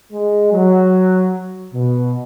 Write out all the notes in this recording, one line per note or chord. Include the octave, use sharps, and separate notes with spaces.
G#3
F#3
B2